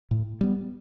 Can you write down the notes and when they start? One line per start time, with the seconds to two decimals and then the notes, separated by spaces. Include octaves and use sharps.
0.11 A2
0.41 G3 B3